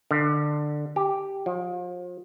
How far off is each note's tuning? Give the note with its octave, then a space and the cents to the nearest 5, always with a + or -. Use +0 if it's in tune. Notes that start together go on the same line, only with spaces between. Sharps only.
D3 +15
G4 +0
F3 +35